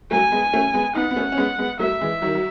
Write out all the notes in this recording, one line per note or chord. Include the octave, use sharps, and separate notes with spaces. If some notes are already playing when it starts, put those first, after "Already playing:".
F#3 A3 G#5
G#3 B3
A3 C#4
G#3 B3
B3 D#4 F#5
B3
A3 C#4
C#4
G#3 B3
G#3 B3
F#3 A3 E5
E3 G#3
D#3 F#3
F#3